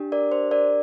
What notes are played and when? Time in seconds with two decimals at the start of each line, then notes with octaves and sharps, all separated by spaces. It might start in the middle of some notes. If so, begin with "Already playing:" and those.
Already playing: D4 G4
0.12 A#4 D5
0.32 C5
0.51 A#4 D5